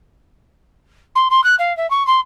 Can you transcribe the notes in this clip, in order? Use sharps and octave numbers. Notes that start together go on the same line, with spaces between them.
C6
C6
F#6
F5
E5
C#6
C6